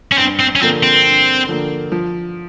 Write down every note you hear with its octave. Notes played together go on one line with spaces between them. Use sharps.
C#4
G2 C4
C4
C#4
D3 F3 A#3 C4
C4
G2
D3 F3 A#3
F3